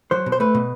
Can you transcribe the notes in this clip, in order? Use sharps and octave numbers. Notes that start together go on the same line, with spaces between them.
F#3 C5
B2
C5
A3 B4
B2